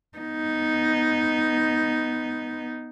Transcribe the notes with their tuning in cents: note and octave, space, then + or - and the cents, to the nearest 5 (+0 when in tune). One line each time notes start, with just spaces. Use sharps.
B3 +0 D#4 +0